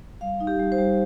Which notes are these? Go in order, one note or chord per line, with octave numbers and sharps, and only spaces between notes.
G3 F5
D#4
G4
G3
C5
G3